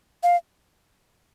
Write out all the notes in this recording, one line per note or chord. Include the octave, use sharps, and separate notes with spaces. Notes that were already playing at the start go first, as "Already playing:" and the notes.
F5